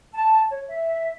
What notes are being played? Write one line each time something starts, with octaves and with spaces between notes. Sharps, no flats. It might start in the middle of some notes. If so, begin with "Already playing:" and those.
A5
C#5
E5